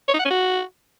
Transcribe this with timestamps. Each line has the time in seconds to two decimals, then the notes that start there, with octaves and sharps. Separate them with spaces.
0.08 C#5
0.14 D#4
0.19 F#5
0.25 C#4
0.30 F#4